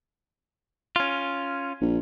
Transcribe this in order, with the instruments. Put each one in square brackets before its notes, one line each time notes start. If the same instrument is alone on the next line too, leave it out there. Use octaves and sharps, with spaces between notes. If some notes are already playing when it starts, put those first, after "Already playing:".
[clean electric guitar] C#4 F4
[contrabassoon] A#1